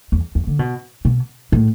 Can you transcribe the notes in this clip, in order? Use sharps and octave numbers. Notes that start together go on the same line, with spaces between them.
E2
E2
D3
B2
B2
A2